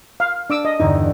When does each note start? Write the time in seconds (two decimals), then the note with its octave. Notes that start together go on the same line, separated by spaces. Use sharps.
0.20 F5
0.50 D4 D6 E6
0.65 D#5
0.80 E2 G2 D3 D#4